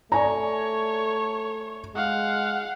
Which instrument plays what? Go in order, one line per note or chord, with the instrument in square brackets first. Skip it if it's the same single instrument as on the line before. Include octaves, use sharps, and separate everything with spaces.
[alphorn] A3 [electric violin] C#5 [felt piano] D5 G#5 A#5
[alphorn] G#3 [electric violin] F5 F#5